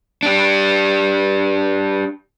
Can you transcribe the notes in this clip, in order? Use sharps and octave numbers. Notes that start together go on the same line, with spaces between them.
D4 G4